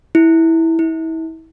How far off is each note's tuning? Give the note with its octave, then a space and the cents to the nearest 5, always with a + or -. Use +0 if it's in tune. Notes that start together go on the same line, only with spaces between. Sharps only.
E4 -15
E4 -35